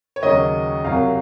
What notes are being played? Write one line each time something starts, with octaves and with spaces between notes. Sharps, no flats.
C#5
D#2 C#3 F#3 D#5
C2 C3 F#3 F5